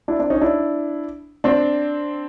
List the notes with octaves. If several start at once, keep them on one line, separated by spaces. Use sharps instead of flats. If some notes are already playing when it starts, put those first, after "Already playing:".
D4 E4
C4 D4
C#4 D#4
D4 E4
C4 D4